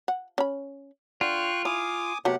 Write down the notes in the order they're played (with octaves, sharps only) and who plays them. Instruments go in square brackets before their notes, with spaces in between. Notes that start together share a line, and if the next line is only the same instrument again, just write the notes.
[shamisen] F#5
C#4 B5
[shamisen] D3 [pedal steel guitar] F4 [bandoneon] G5 C#6 F#6
[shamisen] E4 [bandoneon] G#5 D6 D#6
[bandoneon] C3 G4 F#5 [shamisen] F#3 A3 B3